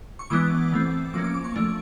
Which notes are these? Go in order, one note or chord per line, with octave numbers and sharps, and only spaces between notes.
C#6
E3 G#3 B3 D4 D6
E3 A3 C4
F3 A#3 C#4 D6
D6
D6
C#6
F3 A3 D4